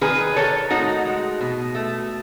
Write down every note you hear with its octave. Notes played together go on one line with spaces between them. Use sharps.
D#3 G#4 B4
D#3 A4 C#5
A2 D#4 F#4
G#3
B2
A3